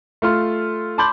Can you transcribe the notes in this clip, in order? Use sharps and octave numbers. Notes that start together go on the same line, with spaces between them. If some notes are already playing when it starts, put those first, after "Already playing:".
A3 F4 C6
A5 B5 C6 D6 G6 F#7